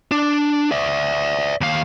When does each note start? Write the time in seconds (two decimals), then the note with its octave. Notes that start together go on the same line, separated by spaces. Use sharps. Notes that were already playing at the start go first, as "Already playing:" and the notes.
0.11 D4
0.72 D5 E5
1.61 D#2 F5